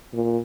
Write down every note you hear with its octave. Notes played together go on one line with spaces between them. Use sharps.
A#2